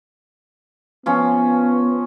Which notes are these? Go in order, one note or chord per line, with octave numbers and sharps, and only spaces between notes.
F3 B3 C#4